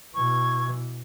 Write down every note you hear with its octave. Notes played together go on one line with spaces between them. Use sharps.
B2 E3 C#6 G#6